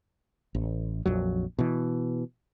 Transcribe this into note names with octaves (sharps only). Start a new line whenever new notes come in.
A1
A#1 F2 F#3
B2 E3